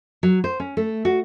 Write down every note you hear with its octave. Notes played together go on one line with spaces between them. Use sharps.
F#3
C5
C#4
A3
F#4